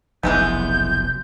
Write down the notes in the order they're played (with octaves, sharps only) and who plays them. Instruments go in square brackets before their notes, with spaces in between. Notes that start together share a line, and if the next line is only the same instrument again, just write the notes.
[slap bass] F1 B1 F#2 [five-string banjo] E3 G#3 B3 [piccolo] G6